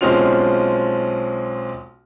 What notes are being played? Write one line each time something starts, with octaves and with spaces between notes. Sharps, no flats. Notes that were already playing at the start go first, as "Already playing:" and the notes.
B1 G#3 C4 C#4 F4 F7